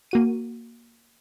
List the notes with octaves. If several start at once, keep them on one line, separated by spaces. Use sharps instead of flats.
A#3 F#4 D#7